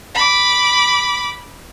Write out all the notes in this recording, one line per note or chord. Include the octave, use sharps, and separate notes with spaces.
B5 D6